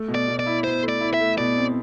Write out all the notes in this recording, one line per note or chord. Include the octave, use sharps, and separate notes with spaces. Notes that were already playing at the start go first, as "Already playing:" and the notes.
Already playing: A3
B2
D5
B2
D5
E4
B2 C5
A3
D5
E4
E5
A3
B2 D5
C4